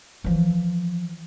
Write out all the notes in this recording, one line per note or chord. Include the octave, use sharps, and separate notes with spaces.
E3 F3